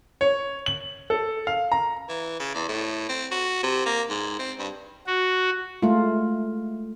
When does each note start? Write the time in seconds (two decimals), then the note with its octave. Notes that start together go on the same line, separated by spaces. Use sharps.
0.21 C#5
0.66 F#7
1.10 A4
1.47 F5
1.72 A#5
2.09 E3
2.39 C#3
2.54 E2
2.69 A2
3.09 C4
3.31 F#4
3.63 C3
3.86 A#3
4.09 G#2
4.39 C4
4.59 G2
5.06 F#4
5.82 G#3 A3 F4